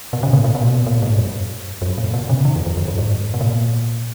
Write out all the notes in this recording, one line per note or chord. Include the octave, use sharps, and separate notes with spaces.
B2
C#3
A#2
A#2
B2
A#2
G#2
F#2
F#2
A#2
B2
C#3
D#3
F2
F2
F#2
F#2
G#2
B2
A#2